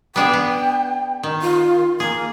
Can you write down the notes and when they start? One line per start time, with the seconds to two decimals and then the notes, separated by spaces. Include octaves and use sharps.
0.16 B3 D4 G#4 G5
0.33 B3
1.23 D#3
1.42 F4
2.00 A#3 G#4